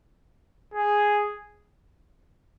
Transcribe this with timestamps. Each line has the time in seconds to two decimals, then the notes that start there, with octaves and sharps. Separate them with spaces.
0.74 G#4